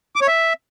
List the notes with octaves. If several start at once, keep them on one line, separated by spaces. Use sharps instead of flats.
D6
C#5
E5